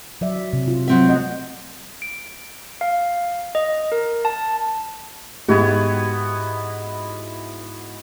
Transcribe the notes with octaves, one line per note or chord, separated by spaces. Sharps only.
F#3 D5 E5
C3
F4
F#3 C4 E5
A3 D#5 F#5
D7
F5
D#5
A#4
A5
G#2 B3 E4 F#4 G4